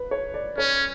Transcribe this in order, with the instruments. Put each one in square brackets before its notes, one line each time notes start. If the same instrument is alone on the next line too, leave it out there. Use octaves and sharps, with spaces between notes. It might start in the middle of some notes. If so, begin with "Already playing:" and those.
Already playing: [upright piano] B4
C#5
D5
[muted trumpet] C#4 [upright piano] C#5